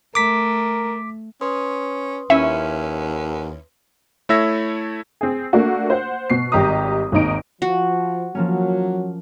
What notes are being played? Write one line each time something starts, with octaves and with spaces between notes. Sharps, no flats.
A3 A#4 D6 B6
C#4 B4 C6 D#6
D#2 C#4 E4 E5
A3 E4 C#5 E5 E6 A#6
C4 G#4
A3 A#3 D4 F#4
C5 F#5
B2 C7
G#1 G3 G4 D#5 A#5 D#6
G#1 D#2 D#4 D7
F3 F#4
F3 F#3 A#3 C#4